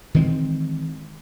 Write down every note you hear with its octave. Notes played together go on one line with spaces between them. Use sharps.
D#3 E3 G#3 C4